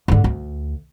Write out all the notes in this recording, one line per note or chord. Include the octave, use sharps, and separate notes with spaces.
G#2 D3
D2